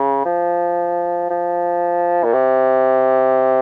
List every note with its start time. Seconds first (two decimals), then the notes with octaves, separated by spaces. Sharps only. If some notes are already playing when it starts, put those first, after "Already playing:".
Already playing: C#3
0.25 F3
1.30 F3
2.24 A#2
2.33 C3